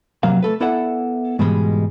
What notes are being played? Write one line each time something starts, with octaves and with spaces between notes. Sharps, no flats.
F2 C3 F#3 A#3 F5
A3 A4 B4
B3 E4 A4 D5 E5 F#5
G#2 B2 E3 G3 G#3